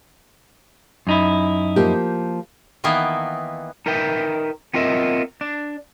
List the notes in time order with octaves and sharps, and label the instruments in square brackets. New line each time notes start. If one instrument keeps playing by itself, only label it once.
[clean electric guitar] F#2 D#4 E4
[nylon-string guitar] F3 A#3 G4
[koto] D#3 E3 A#3 B3
[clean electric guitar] D#4 A#4 B4 E5 G5
B3 C4 F4 A#4 D#5 E5
D4